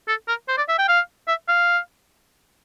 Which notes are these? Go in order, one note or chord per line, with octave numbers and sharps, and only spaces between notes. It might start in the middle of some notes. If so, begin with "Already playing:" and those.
A4
A#4
C5
D5
E5
G5
F5
E5
F5